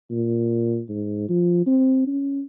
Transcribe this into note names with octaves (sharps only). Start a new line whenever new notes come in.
A#2
G#2
F3
C4
C#4